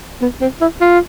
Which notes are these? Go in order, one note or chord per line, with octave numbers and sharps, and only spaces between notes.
B3
C4
E4
F4